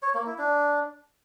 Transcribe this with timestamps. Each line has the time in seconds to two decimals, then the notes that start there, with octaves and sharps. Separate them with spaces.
0.02 C#5
0.14 A#3
0.26 E4
0.38 D4